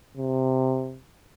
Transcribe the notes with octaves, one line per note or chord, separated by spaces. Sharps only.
C3